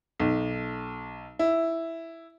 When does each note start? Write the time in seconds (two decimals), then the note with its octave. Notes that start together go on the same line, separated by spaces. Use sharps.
0.20 B1
1.39 E4